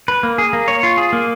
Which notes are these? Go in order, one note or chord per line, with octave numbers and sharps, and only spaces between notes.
B4
A#3
G#4
A#3
C#5
F4
G#4
A#3